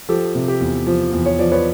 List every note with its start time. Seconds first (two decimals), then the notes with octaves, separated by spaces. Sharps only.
0.09 F3 G4 A4
0.35 C3
0.48 G4
0.61 E2
0.87 F3
1.13 E2
1.26 C#5
1.39 F3 D5
1.51 B4 C#5